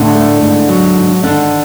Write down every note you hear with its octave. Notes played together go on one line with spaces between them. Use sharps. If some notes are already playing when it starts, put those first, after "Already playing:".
Already playing: A2 D3 D4
A3
G#2
F#3
G#2
D3 D#3 D4